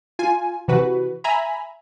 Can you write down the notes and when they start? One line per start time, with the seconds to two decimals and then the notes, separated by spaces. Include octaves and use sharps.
0.19 F4 G#5
0.68 C3 E3 F#4 B4
1.24 E5 G#5 A#5 B5